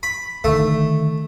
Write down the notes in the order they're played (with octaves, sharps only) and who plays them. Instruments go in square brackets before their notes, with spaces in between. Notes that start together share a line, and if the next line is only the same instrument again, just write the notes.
[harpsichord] B5
[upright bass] D3 D#3 [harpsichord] A3